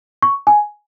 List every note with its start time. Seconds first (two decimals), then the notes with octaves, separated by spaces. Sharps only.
0.22 C#6
0.47 G#5